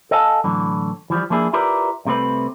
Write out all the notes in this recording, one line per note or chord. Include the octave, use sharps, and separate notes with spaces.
A4 D#5 F5 G#5 A5
A2 D3 E3 F#3
E3 F3 G3
F3 A#3 D4 E4 G#4
E4 F4 G4 A#4 B4 D5
C2 C3 A3 C4 B4